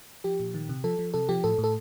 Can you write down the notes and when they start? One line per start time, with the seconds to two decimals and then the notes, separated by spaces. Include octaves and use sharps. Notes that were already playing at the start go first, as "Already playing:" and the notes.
0.24 F3 G4
0.40 A#2
0.54 D#3
0.69 C3
0.84 F3 A4
0.99 F3
1.14 C3 A4
1.29 F3 G4
1.44 A2 A4
1.58 A2
1.64 A4